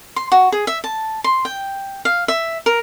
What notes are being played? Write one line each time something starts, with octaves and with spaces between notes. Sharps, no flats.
C6
F#4
G#4
E5
A5
C6
G5
F5
E5
A#4